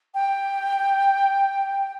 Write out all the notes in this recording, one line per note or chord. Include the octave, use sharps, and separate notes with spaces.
G5